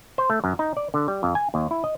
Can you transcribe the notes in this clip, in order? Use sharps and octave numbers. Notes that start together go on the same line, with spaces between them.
C5
A3
F#2
D#4
D5
D3
G3
F2
G#5
D#2
E4
D#5